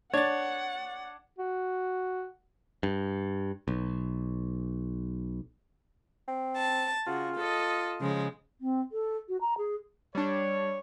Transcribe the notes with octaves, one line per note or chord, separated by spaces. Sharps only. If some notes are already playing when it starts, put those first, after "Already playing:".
D4 C#5 F#5 G#6 A6
F#4
G2
B1
C4
A5
C#3 F4 F#4
A4 D#5
C#3 F3 G#3
C4
A4
F#4
A#5
G#4
G3 D4 C#5